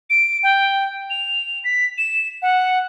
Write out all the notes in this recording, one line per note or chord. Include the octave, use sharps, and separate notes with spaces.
D7
G5
F7
B6
E7
F#5